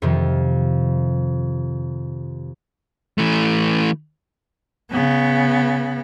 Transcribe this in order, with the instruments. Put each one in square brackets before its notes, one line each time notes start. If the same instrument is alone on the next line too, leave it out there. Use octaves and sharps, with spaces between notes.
[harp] F2 C3 D#3 F3
[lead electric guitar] E3 A3
[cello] C#3 B3